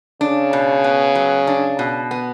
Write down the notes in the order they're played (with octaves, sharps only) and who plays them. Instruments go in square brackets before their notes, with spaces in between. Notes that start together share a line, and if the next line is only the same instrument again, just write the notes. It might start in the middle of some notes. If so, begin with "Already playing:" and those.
[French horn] C#3 [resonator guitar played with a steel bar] D4
[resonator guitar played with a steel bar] B2
B3
F#3
D4
B2
B3